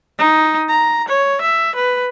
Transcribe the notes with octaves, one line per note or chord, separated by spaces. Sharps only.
D#4
A#5
C#5
E5
B4